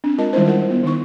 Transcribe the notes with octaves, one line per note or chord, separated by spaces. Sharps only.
C4 D4
G#3 F4 A#4 D#5 A5
D#3 G3 G#3 C#4 E4 C5
F4 A#4 F#5
B3
D#3 D#4 C#6